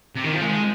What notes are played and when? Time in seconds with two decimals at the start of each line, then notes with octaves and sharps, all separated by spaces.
0.15 C3
0.24 D#3
0.32 F3
0.41 G#3